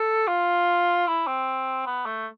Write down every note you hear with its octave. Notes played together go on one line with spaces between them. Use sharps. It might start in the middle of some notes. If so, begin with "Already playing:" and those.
Already playing: A4
F4
E4
C4
B3
A3